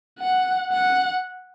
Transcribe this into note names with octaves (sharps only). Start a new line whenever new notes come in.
F#5
F#5